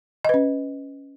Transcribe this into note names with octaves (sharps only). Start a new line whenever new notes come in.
C#4 B4 D#5